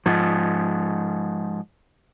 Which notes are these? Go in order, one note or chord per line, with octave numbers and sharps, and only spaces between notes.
G#2 F3